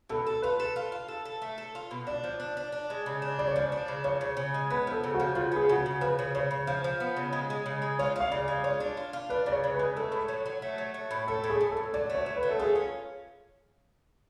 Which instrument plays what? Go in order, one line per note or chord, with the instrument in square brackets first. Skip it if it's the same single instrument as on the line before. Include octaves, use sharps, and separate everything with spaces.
[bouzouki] B2 [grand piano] A4
[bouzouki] A4
[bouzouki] F4 [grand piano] B4
[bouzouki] A4
F4
F4
A4
A4
A3
A4
F4
B2
[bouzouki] D4 [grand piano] D5
[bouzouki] F3
D4
D4
D4
G#3
C#3
D4
[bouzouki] C#3 [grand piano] D5
[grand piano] C#5
[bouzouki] F3 [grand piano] D5
[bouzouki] D4
C#3
[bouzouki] F3 [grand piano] C#5
[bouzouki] C#3
C#3
G#3
[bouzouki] B3 [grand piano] B4
[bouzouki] F3 [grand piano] A4
[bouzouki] C#3
[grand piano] F#4
[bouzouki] F3
[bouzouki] C#3 [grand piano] F4
[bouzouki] B3 [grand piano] G#4
[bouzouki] C#3 [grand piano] F#4
[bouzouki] C#3
[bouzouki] F3 [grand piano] B4
[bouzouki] C#3
[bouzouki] C#3 [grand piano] C#5
[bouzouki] C#3
[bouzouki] F3 [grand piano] F5
[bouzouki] F3
B3
C#3
G#3
G#3
C#3
G#3
[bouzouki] F4 [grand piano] C#5
[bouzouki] F4 [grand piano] F5
[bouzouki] C#3 [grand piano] D5
[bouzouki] G#3
[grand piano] D5
[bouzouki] F4 [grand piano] C#5
[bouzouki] D4
F4
F4
[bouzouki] D4 [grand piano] B4
[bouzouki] C#3 [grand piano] D5
[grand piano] C#5
[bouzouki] C#3
[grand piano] B4
[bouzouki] G#3
[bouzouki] A3 [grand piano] A4
[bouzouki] A2
F#3
F#3
A3
F#3
A3
A2
[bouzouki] A3 [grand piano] A4
[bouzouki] A2
[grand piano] G#4
[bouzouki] A2
[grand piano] A4
[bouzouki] A2
[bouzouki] F#3 [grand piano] D5
[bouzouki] A3
[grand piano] C#5
[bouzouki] F#3
[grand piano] B4
[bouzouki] A3
[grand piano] A4
[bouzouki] F4 [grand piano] G#4
[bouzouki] C#4